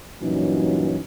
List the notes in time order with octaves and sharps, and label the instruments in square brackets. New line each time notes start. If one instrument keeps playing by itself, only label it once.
[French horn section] G2 A#2 E3 F#3 C#4 D#4